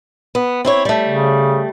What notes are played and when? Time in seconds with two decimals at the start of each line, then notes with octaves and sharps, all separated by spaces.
0.35 B3
0.65 C4 E4 C#5
0.85 G3 A3
1.08 C#3